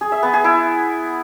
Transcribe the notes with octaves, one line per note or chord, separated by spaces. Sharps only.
G#4
E5
B3
G#4
E4